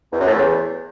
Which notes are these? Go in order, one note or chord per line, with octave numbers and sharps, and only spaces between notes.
E2
F#2
A2
E2